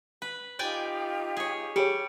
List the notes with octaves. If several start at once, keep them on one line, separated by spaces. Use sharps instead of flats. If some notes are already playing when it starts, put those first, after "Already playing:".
B4
D#4 F4 G4 D5 G5 G#5
G#4 C#5
G3 G4 G#4 C#5 C#7 D7